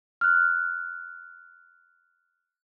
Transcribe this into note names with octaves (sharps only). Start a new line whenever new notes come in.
F6 F#6